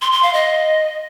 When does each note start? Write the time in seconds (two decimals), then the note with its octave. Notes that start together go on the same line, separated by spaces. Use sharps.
0.02 C6
0.12 C6
0.23 F5
0.33 D#5